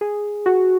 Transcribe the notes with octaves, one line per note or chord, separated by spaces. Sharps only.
G#4
F#4